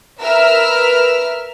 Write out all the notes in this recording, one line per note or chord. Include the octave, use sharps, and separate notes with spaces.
A#4 B4 E5 E6 F6